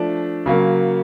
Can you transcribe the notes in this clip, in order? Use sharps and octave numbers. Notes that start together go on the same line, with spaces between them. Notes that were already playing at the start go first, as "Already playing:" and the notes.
Already playing: F3 A3 D4
C#3 F#3 A#3